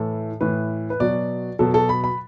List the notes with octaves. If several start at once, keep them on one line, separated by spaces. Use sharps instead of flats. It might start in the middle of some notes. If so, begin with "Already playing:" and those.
Already playing: A2 E3 A4
A2 E3 B4
B4
B2 F#3 D5
B2 F#3 A4
A4
B5
B5